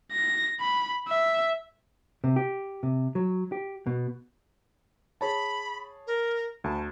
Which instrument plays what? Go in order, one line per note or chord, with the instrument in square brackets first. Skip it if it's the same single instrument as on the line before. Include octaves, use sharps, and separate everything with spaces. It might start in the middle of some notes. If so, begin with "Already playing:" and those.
[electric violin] A#6
B5
E5
[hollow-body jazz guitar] C3
G4
C3
F#3
G4
B2
[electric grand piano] G#4 C#5 A5 [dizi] B5
[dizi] A#4
[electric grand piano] D2 [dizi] A5